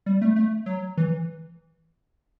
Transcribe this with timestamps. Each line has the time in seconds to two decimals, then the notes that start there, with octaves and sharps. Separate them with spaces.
0.06 G3
0.22 A3
0.36 A3
0.66 F#3
0.97 E3